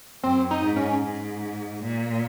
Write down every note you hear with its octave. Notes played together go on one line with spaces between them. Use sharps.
F#2 C4
D#4
G#2
C#4
G#2
A#2